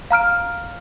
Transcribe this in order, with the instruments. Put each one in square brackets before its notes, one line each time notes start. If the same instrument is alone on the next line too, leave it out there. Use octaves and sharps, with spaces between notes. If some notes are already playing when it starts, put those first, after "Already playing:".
[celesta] F5 A#5 F6 D7